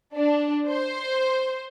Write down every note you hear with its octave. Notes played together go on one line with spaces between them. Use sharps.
D4
C5